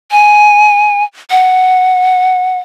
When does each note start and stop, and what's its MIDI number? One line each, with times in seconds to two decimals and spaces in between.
0.12 1.04 80
1.31 2.59 78